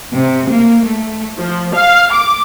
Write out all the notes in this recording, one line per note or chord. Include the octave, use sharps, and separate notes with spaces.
C3
A#3
A3
F3
F5
D6